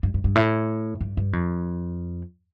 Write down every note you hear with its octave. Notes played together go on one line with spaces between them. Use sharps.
G2
G2
G2
A2
G2
G2
F2